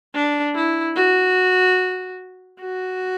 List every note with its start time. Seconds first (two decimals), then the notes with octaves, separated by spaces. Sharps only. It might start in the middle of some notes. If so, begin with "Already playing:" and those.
0.14 D4
0.55 E4
0.96 F#4
2.61 F#4